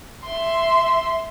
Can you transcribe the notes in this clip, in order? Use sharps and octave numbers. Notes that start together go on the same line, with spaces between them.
E5 C6